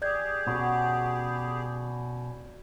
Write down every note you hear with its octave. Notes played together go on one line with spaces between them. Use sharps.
G4 G#4 D5 G6 G#6
B2 C#4 F#4 A#4